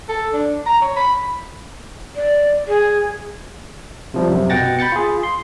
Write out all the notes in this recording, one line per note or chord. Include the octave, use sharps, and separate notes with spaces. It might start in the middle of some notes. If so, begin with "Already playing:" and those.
A4
D4
A#5
C#5
B5
D5
G#4
C3 F3 G3
F#2 C3
B2 F#5 G5 A6 A#6
B5 G6 A6 C#7
F4 G#4
C6